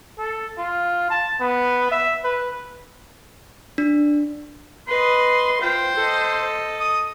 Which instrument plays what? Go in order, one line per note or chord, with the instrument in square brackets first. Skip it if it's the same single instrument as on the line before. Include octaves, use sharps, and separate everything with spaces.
[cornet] A4
F4
A5
B3
E5
B4
[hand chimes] D4
[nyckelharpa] B4 D#5 [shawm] C6
[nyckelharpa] F4 G5 [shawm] C5
[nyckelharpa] A4 D#5
[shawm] D#6